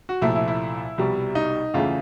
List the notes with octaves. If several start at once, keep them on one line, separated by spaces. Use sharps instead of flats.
F#4
C2 A#2 F3 A3 E4
E4
E4
C2 B2 G3
D#4
E2 C#3 E3 A3 F4